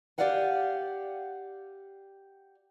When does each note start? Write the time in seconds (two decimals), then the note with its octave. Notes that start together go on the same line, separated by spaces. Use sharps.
0.18 G4 G#4 D5 F5 F#5 G#5